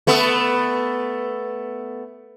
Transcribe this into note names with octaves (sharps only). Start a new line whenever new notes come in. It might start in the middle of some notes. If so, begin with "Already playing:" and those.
A3 B3 A4